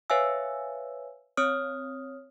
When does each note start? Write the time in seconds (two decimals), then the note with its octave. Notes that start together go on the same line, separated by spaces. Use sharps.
0.10 B4 C#5 E5 F5 G#5 E6
1.37 C4 C#5 D#6 F6